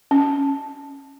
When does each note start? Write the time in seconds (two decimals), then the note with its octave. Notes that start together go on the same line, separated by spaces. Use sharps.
0.11 C#4